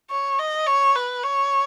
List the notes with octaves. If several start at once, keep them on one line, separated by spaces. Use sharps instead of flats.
C#5
D#5
C#5
B4
C#5